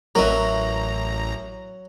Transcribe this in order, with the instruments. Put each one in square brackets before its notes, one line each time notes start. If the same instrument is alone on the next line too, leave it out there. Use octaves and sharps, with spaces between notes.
[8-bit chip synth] A1 A#5 [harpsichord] F#3 [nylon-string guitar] A#4 B4 E5